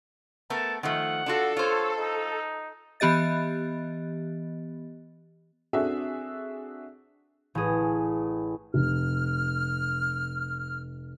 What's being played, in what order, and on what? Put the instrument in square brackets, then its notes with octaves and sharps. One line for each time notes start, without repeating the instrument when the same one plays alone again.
[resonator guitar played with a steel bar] A3 B3 A#4 [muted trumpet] A5
[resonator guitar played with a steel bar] D#3 F3 A3 [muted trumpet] F#5
[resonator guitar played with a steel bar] D4 F4 F#4 [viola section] A4
[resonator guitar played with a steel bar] F4 C5 [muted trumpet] C#5
[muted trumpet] D#4
[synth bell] E3 B3 G4 D#5 A6
[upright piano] C4 D4 F#4 G#4 A4 E5
[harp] A1 G#4
[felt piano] F1 [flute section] F6